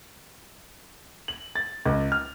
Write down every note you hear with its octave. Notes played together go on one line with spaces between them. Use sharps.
F#7
A6
C#2
F6